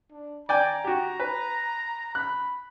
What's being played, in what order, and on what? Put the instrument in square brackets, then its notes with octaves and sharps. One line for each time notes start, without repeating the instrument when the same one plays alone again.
[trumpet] D4
[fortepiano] D5 G5 G#5 [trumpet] A#5
[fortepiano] F#4 G4
B4
[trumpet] B5 [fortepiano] F#6